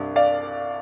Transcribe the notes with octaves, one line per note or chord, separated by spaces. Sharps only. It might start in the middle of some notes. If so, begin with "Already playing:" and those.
Already playing: C2 G2
D5 F5